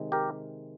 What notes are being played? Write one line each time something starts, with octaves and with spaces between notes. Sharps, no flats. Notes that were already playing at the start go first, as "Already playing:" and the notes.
Already playing: C3 D#3 G#3
G4 A#4